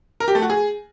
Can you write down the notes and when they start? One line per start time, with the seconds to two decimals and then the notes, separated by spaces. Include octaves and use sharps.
0.20 A#4
0.28 G4
0.35 A3
0.42 F#4
0.50 G#4